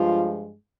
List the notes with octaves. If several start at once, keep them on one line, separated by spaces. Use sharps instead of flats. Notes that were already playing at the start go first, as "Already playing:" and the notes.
Already playing: G2 F3 G#3 F4